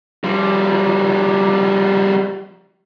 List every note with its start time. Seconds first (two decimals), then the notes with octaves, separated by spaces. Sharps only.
0.24 F3 G3